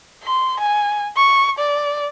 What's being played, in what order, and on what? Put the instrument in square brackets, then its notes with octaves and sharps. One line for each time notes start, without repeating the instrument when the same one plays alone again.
[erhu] C6
G#5
C#6
D5